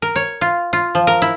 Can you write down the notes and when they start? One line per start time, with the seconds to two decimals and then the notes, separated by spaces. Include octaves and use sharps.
0.02 A#4
0.16 C#5
0.41 F4
0.73 F4
0.95 F3
1.07 A#4
1.22 E4